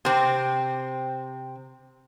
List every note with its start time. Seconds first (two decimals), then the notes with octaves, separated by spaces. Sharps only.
0.05 C3 C4